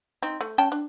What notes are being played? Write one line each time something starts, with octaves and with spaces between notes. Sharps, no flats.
C4 D#4
A3
C#4 G5 A5
D4